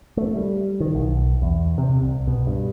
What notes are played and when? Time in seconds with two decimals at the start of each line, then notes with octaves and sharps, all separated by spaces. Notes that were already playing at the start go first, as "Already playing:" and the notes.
0.17 A3
0.36 G3
0.80 D#3
0.95 B1
1.42 E2
1.78 C3
2.03 C2
2.27 B2
2.47 G2